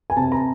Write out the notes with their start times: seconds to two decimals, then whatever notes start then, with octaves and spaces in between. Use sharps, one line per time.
0.10 G#5
0.17 C3 A5
0.32 A#5